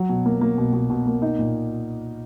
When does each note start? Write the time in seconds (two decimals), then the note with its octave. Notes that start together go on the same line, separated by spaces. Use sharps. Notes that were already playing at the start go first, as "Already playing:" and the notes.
Already playing: F#3 C#5
0.09 B2
0.26 A#3
0.41 A#3
0.58 B2
0.73 B2
0.90 B2
1.07 A#3
1.22 D#4
1.39 A#2